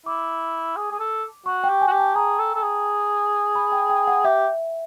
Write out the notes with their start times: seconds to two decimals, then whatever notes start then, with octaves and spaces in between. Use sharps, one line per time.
0.06 E4 D6
0.76 G#4
0.91 G#4
1.00 A4
1.46 F#4 C#6
1.64 G5
1.69 G4
1.81 G#5
1.88 F#4
1.92 G4
1.99 A5
2.15 G#4 A#5
2.39 A4
2.55 A4
2.62 G#4
3.55 B5
3.72 G5
3.90 G5
4.07 F#5
4.24 G4 E5